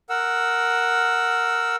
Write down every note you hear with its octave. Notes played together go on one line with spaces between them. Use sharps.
A#4 F#5 E6